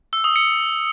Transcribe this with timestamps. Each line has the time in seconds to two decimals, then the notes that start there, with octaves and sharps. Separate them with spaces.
0.13 E6
0.24 D#6
0.36 C#7